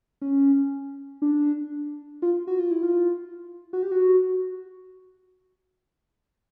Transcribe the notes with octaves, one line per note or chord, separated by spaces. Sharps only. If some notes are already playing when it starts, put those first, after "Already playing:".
C#4
D4
F4
F#4
F4
E4
F4
F#4
G4
F#4